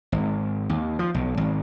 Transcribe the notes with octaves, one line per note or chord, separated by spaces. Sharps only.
G#1
D#2
F3
B1
G#1